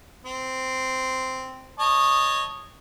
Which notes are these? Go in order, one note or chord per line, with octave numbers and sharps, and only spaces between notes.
C4
C#5 D#5 A5